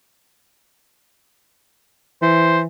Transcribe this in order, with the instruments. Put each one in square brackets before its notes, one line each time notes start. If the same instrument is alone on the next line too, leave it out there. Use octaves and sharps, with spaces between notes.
[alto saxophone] E3 [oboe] C5